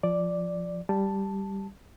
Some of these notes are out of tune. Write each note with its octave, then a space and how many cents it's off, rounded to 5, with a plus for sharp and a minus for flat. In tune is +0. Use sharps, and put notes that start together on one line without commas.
F3 +0 D5 +0
G3 +0 A5 +0